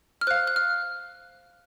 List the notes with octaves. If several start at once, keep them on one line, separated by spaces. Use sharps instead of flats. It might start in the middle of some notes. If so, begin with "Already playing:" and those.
F6
C5 F5 F#6
F#6
F6